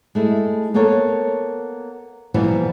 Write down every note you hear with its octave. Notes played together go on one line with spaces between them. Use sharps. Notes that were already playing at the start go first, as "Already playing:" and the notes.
G#3 A3 E4
A#3 B3 A4 A#4 C#5
B2 E3 F3 G3 A#3 B3